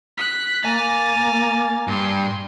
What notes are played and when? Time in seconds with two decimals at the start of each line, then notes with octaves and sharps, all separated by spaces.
0.18 F#6 B6
0.65 A#3 G#5 A#5 A6
1.88 G2 C6